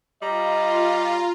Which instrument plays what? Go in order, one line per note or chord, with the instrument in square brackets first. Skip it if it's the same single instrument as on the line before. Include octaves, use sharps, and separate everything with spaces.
[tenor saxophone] G3 [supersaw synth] F4 [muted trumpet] D#5 [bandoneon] A#5